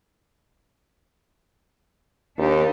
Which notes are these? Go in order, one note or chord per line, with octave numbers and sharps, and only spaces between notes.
D#2 D4 D#4 G4